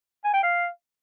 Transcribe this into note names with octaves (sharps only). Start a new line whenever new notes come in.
G#5
G5
F5